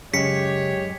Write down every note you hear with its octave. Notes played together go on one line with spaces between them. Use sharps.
F#2 C#3 G#3 G4 C#5 B6 C#7